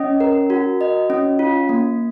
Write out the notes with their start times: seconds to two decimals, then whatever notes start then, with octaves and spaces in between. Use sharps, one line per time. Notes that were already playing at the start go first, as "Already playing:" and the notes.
Already playing: C#4 D#5
0.20 A#4
0.50 F#4
0.81 D#5
1.10 C#4
1.39 F4
1.69 A#3